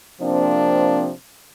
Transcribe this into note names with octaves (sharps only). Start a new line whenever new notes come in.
C3 F3 A#3 C4 D4